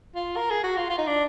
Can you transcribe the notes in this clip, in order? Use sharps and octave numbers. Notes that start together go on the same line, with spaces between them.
F4
A#4
G#4
F#4
F4
F4
D#4
D4